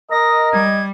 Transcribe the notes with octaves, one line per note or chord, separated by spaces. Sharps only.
A#4 D#5 A#6
G3 G#6